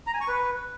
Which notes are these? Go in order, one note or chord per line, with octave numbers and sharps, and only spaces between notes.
A#5
G#5
C#6
B4